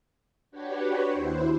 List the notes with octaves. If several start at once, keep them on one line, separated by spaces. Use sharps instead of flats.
D4 F#4 G4 B4 C#5
D#2 E4 C5